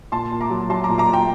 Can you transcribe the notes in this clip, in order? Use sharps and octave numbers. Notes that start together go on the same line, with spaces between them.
A#2 A5 C6
A#2
A#5 D6
F#3
F#3 A5 C6
A#2 A#5 D6
A#5 D6
A#2
G5 A#5